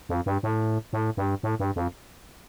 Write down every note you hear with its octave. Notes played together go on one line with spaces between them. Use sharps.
F2
G2
A2
A2
G2
A2
G2
F2